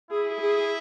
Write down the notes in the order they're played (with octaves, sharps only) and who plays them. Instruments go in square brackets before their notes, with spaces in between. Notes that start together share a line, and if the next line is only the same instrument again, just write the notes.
[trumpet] E4 [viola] G#4
[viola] G#4